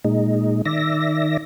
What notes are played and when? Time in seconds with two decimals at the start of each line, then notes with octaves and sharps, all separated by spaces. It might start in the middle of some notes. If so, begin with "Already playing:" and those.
0.04 A#2 G#3 D#4
0.65 D#3 D5 E5 A#6